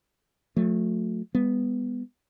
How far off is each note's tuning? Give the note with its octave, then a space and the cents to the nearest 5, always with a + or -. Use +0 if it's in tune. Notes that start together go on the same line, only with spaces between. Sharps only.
F#3 -40 A3 +5
G3 +45 B3 +0